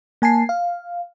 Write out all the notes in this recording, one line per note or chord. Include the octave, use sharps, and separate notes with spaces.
A#3 G#5 A5 C7
F5